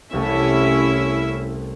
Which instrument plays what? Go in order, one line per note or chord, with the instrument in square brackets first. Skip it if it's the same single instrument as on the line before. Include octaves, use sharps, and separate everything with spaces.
[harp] C2 C3 A3 [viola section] C#4 E4 E5